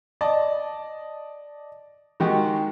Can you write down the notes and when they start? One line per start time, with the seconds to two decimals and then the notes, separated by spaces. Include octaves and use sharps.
0.21 D5 D#5 A5
2.20 D#3 G#3 F#4 G4